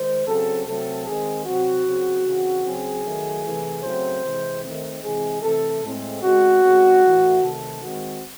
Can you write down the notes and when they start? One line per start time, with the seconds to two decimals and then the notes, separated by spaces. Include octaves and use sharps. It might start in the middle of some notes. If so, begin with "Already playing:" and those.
Already playing: D#3 G#3 C5
0.26 C#3 F#3 C4 A4
0.66 C3 F#3 A3 C4 A4
1.06 D#3 G#3 C4 G#4
1.45 C3 F#3 C4 F#4
1.85 C#3 F#3 C4
2.26 C#3 E3 C4
2.64 C#3 F#3 C4 G#4
3.05 D#3 F#3 A3
3.44 C3 E3 A3
3.84 C#3 F#3 A3 C4 C5
4.24 C3 E3 G#3 C4
4.64 D#3 A3 C4
5.03 C3 E3 G#3 C4 G#4
5.43 C3 E3 A3 C4 A4
5.83 A2 G#3 C4
6.22 C#3 G#3 C4 F#4
6.62 C#3 G#3 C4
7.02 A2 E3 A3
7.42 C3 D#3 A3 A4
7.81 D#3 G#3 C4 F#4